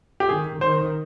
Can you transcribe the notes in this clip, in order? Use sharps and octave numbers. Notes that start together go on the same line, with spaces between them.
G4
D#3 G#4
D#3 C5